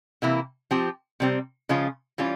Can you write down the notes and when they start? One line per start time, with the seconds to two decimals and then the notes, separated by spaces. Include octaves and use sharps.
0.22 C3 E3 A#3 E4
0.71 F3 C4 G4
1.20 C3 G3 C4
1.69 C#3 F3 G#3 C#4 F4
2.18 E3 G3 C#4 F4